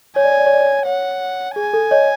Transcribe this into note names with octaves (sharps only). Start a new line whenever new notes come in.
C#5 G#5
D5
C#5
D5
C#5
D5
C#5
C#5 F#5
G#4 G#5
A4
C#5 D#5